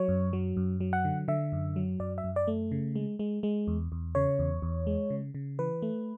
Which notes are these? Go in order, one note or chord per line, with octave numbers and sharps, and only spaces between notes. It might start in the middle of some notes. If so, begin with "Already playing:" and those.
Already playing: F#3 C#5
F#2
F#3
F#2
F#3
F#5
D3
D3 E5
F#2
F#3
F#2 D5
E5
F#2
D5
A3
C#3
G#3
G#3
G#3
E2
E2
C#3 C#5
E2
E2
G#3
C#3
C#3
E3 B4
A3